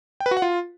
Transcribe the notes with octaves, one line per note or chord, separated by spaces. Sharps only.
G5
B4
F#4
F#5
F4